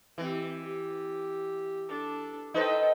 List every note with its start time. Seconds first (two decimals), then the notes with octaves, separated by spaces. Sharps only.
0.18 E3 C4 G4
0.61 G4
1.89 D4 A4
2.54 D#4 A4 B4 C5 G5